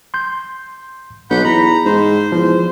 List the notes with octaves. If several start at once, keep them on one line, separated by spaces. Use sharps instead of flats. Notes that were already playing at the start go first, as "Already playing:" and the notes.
C6 G6
B1 F#5 B5 G6
E2 A#5 B5
G#2 C5
E2 F3